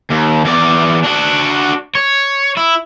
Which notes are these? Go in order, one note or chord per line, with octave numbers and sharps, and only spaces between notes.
D#2
E2 D5
D4 F#4
C#5
E4